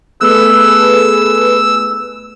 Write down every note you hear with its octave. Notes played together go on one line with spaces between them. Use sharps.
A3 B3 G#4 A4 B4 E6 F#6